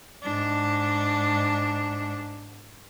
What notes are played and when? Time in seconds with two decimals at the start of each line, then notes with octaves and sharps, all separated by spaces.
0.23 G#2 D4